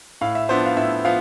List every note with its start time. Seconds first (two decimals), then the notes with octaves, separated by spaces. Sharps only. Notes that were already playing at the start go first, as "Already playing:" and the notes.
0.21 A2 F5
0.35 E5
0.49 F3 B3 D4 C5
0.66 F5
0.77 A2 E5
1.05 F3 B3 F5